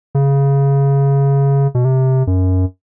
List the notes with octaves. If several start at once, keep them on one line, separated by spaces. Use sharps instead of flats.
C#3
B2
C3
F#2